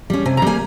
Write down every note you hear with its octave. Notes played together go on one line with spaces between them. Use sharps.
G3 C#4
C3 G#5
A#5
G3 A#3 G#5